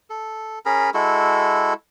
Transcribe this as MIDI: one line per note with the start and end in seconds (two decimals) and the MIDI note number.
0.10 0.59 69
0.65 0.90 61
0.65 0.90 68
0.65 0.90 70
0.65 0.90 83
0.94 1.73 56
0.94 1.73 64
0.94 1.73 66
0.94 1.73 69